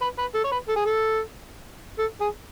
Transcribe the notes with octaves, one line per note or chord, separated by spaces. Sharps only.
B4
B4
A4
C#5
B4
A4
G#4
A4
A4
G#4